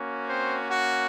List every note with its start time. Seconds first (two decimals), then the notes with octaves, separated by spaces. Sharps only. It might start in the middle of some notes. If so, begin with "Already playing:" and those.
Already playing: A#3 C#4 F#4
0.28 C4 C5
0.68 F#4 F#5